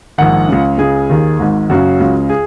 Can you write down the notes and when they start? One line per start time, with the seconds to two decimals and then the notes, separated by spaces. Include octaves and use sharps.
0.18 A#1 G#2 D#3 F#5
0.48 C#2 C#3
0.78 C#2 C#3 G#4
1.10 D#2 D#3
1.39 G#1 G#2 D#3
1.70 F#1 F#2 C#3 F#4
2.00 C#2 C#3
2.29 G#4